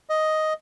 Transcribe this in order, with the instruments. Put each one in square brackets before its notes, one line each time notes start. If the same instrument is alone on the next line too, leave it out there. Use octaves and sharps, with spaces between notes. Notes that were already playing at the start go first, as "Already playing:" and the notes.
[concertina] D#5